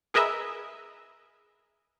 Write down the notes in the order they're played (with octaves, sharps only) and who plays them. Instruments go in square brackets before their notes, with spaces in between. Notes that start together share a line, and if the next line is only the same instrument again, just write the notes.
[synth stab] G#4 A#4 B4 D#5 E5